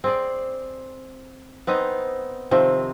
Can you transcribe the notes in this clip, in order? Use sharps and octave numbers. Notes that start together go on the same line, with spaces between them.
C4 G#4 D5
B3 C4 D#4 D#5
C3 D#3 F3 C4